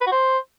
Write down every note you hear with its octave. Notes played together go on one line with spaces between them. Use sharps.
B4
F#4
C5